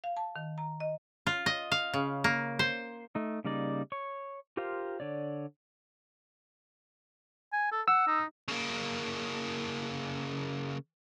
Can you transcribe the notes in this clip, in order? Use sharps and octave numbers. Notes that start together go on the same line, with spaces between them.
F5
A5
D#3
A#5
D#5
F4
D#5
F5
C#3
A#3
C5
A3 D#4
C#3 G3 A#3 D#4 D5
C#5 C#6
F4 G4 A#4 C5 F5
D3 C#5 D5
G#5
A4
F#5 E6
D#4
C#3 A#3